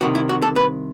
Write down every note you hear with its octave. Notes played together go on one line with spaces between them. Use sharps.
C2 C3 D#3 F#4
E4
F#4
A4
B4